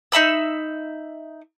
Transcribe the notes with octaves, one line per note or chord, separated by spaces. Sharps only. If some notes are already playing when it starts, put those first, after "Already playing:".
D#4 E5 B5 E6